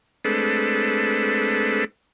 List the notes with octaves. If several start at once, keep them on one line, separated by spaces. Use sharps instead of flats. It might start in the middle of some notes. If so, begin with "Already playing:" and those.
G#3 A3 C4 D4 A4 B4